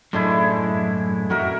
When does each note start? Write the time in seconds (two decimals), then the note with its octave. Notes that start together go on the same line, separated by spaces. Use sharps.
0.13 F#2 A2 D3 G#3 E4
1.30 F2 F#4 A#4 E5